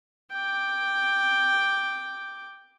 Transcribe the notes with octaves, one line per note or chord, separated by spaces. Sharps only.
G5 D6